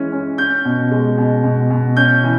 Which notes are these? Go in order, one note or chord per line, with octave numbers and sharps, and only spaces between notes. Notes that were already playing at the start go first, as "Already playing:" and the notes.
Already playing: E3 G#3 C#4
C#4
C#4 G6
B2
G#3
B2
B2
B2
C#4 G6
E3